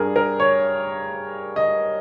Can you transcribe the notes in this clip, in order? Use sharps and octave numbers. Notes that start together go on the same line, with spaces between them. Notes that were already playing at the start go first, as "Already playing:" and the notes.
Already playing: G2 G3 G#4 A#4
A#4
C#5
D#5